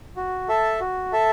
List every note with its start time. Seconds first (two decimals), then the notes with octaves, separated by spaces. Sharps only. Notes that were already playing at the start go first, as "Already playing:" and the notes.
0.16 F#4
0.48 A4 E5 A5
0.80 F#4
1.12 A4 E5 A5